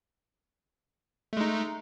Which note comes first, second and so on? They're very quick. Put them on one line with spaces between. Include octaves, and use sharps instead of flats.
A3 G#3 D#4